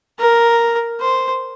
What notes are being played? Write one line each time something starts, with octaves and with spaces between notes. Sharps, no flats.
A#4
C5